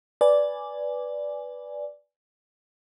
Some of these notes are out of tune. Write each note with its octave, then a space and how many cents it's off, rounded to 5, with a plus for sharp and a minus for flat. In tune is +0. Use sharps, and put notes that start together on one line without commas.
B4 +0 D5 -5 G#5 +0